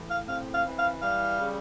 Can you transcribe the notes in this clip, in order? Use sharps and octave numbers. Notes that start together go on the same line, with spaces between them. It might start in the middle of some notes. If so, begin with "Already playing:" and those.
Already playing: A2 E3
F5
C4 F5
F5
E3
F5
G3 F5
C#3